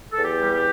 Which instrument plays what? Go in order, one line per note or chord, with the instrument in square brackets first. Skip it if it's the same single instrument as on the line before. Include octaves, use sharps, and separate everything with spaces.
[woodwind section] E2 A4
G4
G3
G4